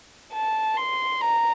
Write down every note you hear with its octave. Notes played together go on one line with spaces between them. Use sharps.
A5
C6
A#5